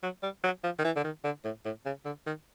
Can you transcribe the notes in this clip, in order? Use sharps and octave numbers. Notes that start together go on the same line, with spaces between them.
F#3
G3
F#3
F3
D#3
E3
D3
D#3
D3
A2
A2
C#3
D3
D#3